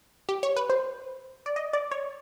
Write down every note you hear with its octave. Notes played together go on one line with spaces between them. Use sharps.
G4
C#5
B4
C5
D5
D#5
D5
C#5